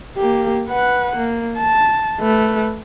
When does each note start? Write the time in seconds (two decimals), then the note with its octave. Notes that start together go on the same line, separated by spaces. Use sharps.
0.17 A#3 G4
0.69 B4 F#5
1.17 A#3
1.58 A5
2.20 A3 B4